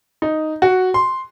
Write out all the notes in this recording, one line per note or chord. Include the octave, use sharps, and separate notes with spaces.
D#4
F#4
C6